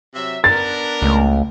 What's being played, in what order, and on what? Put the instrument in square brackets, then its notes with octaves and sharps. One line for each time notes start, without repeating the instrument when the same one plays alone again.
[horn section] C3 F#3 E5
[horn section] B3 D4 A#4 [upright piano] A6
[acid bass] C#2 [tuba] A3